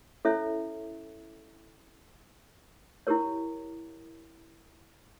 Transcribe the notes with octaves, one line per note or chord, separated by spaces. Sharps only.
C#4 E4 A4 C#5 E5
E4 G4 A#4 C#5